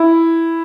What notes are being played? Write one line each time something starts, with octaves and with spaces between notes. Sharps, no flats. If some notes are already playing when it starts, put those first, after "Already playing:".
Already playing: E4